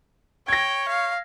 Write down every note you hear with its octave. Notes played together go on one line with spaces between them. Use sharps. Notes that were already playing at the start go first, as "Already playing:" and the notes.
C#5 G5 G#6 A#6
F5